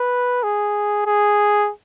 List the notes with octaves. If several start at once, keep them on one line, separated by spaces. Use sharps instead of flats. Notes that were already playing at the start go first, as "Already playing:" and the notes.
Already playing: B4
G#4
G#4